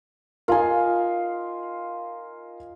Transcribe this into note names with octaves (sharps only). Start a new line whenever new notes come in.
D#4 F4 A#4 F5 G#5